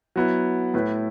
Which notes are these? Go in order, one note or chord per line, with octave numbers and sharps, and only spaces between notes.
F#3 B3 E4
A2 A3 E4 B4